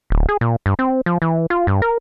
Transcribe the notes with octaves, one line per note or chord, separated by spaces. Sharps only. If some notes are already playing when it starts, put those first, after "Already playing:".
D1
G#4
A#2
G2
C4
F3
E3
F4
G2
A#4